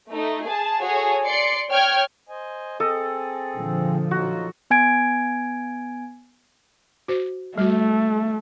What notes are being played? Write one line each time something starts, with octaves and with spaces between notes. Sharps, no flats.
A3 D#4
G#4 A5
F#4 G#4 A4 C#5
D5 C6 C7 C#7
C#5 G5 F6 G#6
C5 D#5 G#5
C4 G#4 A4 D#5
A#2 D3 F3
F#3 D#4 F4 F#4
B3 G#5 G#6 D7
F#4 C5
G3 A3 F#4